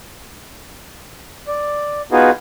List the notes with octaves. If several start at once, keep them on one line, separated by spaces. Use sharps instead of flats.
D5
B3 D#4 F4 F#4 G#4 B4